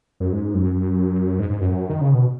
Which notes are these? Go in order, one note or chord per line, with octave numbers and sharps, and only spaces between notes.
F#2
G#2
F#2
G#2
G#2
F#2
D#3
C#3
B2